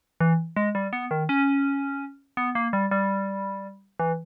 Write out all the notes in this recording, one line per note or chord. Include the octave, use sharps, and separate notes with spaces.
E3
G#3
G3
B3
D#3
C#4
B3
A#3
G3
G3
E3